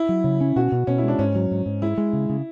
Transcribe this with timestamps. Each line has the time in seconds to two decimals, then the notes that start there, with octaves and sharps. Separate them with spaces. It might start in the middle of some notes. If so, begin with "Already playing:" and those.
Already playing: E4
0.09 F#3
0.24 C#3
0.41 C#4
0.56 B2 F#4
0.72 B2
0.87 B2 C#4
0.98 E4
1.03 G#3 D4
1.19 G#2 C#4
1.35 F#3
1.51 G#2
1.66 G#2
1.82 G#3 E4
1.98 G#3
2.13 C#3
2.29 C#3